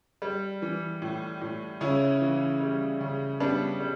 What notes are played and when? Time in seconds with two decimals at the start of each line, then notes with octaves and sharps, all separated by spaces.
0.22 G3
0.62 E3
1.02 A2
1.41 A2
1.81 C#3 C#4 E4
2.21 E3
2.60 G3
3.01 C#3
3.40 G3 B3 D4
3.80 G3